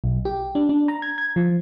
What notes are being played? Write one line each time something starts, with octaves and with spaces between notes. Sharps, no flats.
B1
G4
D4
D4
A#5
G#6
G#6
F3